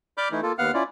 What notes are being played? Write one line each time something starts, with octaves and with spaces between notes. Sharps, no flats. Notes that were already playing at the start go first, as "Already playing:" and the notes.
D5 B5 D6 F6 G6
E3 A3 D#4 E4
A#3 F4 A4
D#2 B3 F5 F#5 F6
C#4 E4 F4 D5